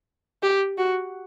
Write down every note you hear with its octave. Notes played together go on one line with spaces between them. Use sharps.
G4
F#4